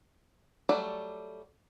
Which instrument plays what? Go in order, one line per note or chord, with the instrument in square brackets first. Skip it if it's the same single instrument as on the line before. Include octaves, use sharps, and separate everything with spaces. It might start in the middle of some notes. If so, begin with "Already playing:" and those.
[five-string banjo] F#3 G3 A3 A4 D5